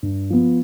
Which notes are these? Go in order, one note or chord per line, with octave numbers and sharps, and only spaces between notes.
G2
F3 B3